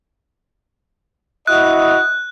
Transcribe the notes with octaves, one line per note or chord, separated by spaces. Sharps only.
E4 F#4 D#5 F#6